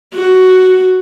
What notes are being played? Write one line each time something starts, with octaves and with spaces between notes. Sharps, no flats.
F#4